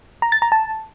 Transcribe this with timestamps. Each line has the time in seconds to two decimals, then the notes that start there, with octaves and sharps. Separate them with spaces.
0.22 A#5
0.32 A6
0.42 A#5
0.52 A5